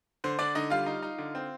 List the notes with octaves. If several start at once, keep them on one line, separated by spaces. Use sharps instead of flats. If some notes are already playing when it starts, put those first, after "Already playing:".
D3 C5
D3 D4 D5
D3 D#4 D#5
G3 F4 F5
D#4
D#4
D3
C4